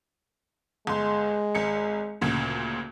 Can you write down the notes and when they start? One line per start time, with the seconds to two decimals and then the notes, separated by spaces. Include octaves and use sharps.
0.87 G1 G#3 C6
1.55 G#1 C#7
2.21 D2 A#2 C#3